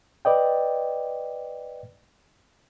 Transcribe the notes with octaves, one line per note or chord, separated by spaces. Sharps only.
B4 D5 D#5 G5